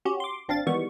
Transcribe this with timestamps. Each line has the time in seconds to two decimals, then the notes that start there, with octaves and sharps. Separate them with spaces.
0.05 C#4 F#4 G4
0.20 C6 D6
0.48 G#1 C4 D4 F5 A6
0.66 D#3 E3 G3 G#3 B3 C#6